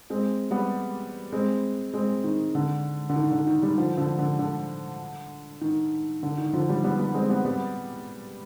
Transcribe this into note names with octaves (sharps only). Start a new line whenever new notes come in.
G#3 C4
G3 B3
G#3 C4
G#3 C4
D#3
D3
D3
D#3
D3
D#3
D#3 G3
D3 F3
D3 F3
D3
D3
D#3
D3
D#3
D3 F3
D#3 G3
G3 B3
G3 B3
G#3 C4
G3 B3
G3 B3